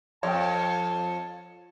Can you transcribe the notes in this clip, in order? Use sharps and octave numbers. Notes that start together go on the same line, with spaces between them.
F2 C#5 G5 A5